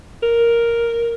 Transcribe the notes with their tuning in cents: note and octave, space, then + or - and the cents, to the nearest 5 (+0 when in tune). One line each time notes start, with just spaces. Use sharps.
A#4 +0